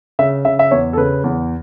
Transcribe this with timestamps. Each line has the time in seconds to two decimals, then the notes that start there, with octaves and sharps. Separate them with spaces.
0.19 C#3 E5
0.45 C#3 E5
0.59 E5
0.71 E2 C#5
0.93 A4
0.97 C#3 B4
1.24 E2